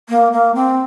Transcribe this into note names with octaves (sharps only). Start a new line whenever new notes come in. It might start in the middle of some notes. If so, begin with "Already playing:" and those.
A#3
A#3
C4